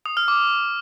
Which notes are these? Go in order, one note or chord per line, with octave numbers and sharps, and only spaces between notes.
D#6
F6
D6